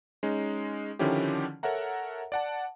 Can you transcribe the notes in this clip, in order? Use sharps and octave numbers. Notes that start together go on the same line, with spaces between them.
G#3 C#4 D#4
D3 D#3 F3 C#4 E4 G4
A4 A#4 C#5 E5 F#5 A#5
D5 F#5 A5